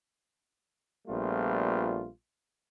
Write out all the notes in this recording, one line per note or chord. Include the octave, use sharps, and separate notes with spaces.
A#1 G3 A3 B3 F4